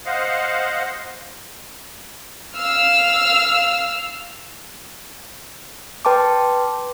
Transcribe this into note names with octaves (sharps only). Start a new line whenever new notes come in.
C5 D#5 F5 F#5
F5 E6 F6
B4 G5 A5 C6 D6